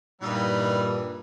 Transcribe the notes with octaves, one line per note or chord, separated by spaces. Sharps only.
G2 A#2 E3 G3 D#4